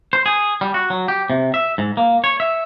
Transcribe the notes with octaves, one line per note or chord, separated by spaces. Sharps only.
C5
G#4
G3
F#4
F#3
G4
C3
E5
G#2
A#3
C#5
E5